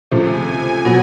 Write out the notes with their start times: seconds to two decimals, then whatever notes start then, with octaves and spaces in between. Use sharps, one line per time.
0.11 C#2 C3 F3 A3 G#5
0.85 B2 F#3